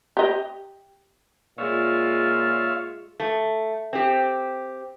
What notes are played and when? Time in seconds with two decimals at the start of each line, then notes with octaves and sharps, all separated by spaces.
0.17 G4 D#5
1.58 A#2 G#3 F4 C#5 E5 F5
3.20 A3
3.93 C4 G4